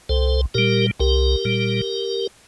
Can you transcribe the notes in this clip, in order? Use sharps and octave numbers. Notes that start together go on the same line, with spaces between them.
C2 A4 C5
A#2 G3 G4 A#4
C2 G4 A#4
A#2 G3